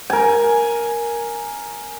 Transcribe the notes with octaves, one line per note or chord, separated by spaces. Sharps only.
A#4 G#5